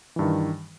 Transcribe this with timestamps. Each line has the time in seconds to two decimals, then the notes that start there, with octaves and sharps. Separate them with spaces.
0.16 E3
0.19 G2
0.22 D#3